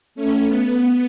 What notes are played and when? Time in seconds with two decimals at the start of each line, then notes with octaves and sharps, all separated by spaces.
0.15 A3 C#4
0.46 B3